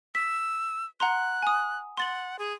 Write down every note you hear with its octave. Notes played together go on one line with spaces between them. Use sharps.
E6 B6
F#5 A#5 C6 F#6
G#5 D#6
F#5 C6 A6 F#7
G#4